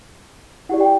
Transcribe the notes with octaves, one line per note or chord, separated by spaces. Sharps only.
E4 G4 D5 F#5
G5